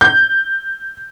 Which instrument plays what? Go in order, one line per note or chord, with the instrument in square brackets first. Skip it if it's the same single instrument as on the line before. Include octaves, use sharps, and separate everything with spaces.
[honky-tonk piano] G6